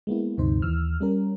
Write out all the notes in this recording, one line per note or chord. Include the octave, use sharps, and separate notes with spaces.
G#3 A#3 B3 E4
D2 G2 C3 D#4 C5
D#2 E3 E6 F6
G3 C#4 A#4